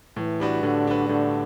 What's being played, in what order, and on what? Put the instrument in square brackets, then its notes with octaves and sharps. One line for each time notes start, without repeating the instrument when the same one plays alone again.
[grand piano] A2 [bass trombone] E3
[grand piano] G3 D4 F#4 B4
[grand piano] A2 [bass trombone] D3
[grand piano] G3 D4 F#4 B4
[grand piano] A2 [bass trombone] D3